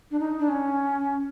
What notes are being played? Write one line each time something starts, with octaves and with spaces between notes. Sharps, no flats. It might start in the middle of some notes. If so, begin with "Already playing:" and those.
D4
D#4
D4
C#4